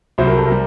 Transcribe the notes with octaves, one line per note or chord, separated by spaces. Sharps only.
C2 C3 F#3 C5
A#4
A4
A#4
G3